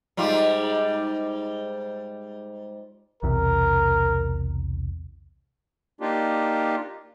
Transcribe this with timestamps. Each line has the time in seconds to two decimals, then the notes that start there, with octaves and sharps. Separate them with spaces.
0.17 G#2 G3 F4
3.23 B1 E2 C3 A#4
6.01 A#3 D4 D#4 F4 G4